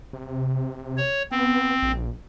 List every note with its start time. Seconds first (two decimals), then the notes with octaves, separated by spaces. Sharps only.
0.13 C3
0.97 C#5
1.32 B3 C4
1.83 A#1